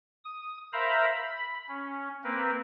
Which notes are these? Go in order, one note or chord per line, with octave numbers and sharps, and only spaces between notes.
D#6
A#4 C5 E5 F5 A#5 B5
B5
C#4
A#3 C4 A#4 B4